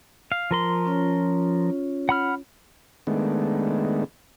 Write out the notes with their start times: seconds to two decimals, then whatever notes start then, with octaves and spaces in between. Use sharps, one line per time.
0.32 F5
0.51 F3 A#4 C6
0.85 C#4 F4 C#5
2.09 F#5 B5 F6
3.07 D#3 G#3 A3 B3 D4